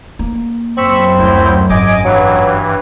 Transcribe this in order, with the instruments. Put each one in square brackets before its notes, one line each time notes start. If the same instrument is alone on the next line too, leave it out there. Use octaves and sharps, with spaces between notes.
[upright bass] A#3
[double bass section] F#2 [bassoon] C4 [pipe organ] B5 C#6 E6
[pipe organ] D2 E4 G6 [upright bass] G3
[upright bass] G#1 [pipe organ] D#5 G#5 D6
[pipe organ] G2 E3 [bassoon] F#3